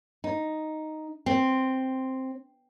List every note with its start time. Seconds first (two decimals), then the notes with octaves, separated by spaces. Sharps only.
0.24 D#4
1.26 C4